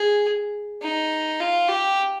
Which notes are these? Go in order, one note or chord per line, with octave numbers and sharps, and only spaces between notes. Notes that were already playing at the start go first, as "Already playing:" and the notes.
Already playing: G#4
D#4
F4
G4